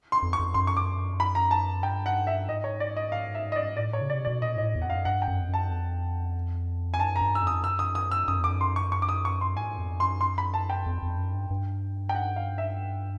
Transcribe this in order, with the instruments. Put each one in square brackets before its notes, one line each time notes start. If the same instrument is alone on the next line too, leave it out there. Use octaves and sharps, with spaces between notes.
[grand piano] C6
[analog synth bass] F2
[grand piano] C#6
[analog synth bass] F2
[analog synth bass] F#2 [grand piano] C6
[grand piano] C#6
D6
B5
A#5
A5
[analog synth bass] G2 [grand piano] G5
[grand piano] F#5
E5
[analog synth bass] G#2 [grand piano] D#5
[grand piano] C#5
D5
D#5
F5
E5
D#5
D5
[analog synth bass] A2 [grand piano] D5
[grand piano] C#5
[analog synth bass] C#3
[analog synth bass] C3 [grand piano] D5
[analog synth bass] B2 [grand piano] D5
[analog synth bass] A#2 [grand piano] D#5
[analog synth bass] G#2 [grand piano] D#5
[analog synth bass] A2
E2
[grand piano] F#5
[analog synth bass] F2 [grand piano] F5
[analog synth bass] F#2
[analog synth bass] G2 [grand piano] F#5
[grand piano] G5
[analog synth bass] F#2
F2
[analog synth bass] F#2 [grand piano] A5
[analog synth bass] F2
[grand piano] G#5
[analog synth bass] F#2 [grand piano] A5
[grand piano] A#5
[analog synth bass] G2
[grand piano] E6
[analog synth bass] F2 [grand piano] D#6
[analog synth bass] F#2 [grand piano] E6
[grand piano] D#6
D#6
E6
[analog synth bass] F#2 [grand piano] D#6
[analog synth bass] F2
[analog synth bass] F#2 [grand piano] D6
[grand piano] C6
C#6
C#6
D6
D#6
C#6
C6
[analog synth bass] G#2 [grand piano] G#5
[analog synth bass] F2
[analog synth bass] F#2 [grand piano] C6
[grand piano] C6
B5
A5
G5
[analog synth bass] F2
F2
F#2
G2
G2
[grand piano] G5
F#5
F5
E5